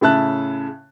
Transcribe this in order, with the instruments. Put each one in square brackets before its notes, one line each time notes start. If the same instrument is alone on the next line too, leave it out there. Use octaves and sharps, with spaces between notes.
[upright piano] A2 C#3 E5 A5 F#6